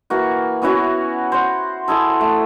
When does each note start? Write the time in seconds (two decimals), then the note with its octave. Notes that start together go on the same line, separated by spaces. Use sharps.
0.10 E3 A#3 F#4
0.62 B3 C#4 E4 F#4
1.32 C5 F#5
1.88 E4 G#4 A4
2.21 A3